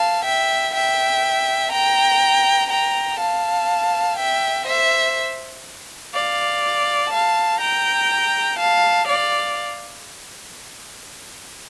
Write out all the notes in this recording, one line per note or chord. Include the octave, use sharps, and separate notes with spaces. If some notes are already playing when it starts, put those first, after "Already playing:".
Already playing: F5 A5
E5 G5
E5 G5
G5 A#5
G5 A#5
F5 A5
E5 G5
C5 E5
D5 F5
F5 A5
G5 A#5
F5 A5
D5 F5